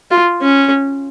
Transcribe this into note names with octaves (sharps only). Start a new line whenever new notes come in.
F4
C#4